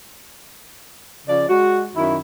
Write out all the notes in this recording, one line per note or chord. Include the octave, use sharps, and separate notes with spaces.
C#3 F3 D5
G#3 F#4
F#2 D#3 E4